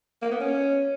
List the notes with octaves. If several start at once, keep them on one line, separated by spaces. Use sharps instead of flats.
A#3
B3
C#4